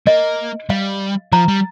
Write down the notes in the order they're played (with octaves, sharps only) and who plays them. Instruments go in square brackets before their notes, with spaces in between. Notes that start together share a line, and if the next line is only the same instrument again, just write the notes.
[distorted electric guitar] A#3 [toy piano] D#5
[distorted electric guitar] G3 [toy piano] F5
[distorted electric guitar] F3 [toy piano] A#5
[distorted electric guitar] G3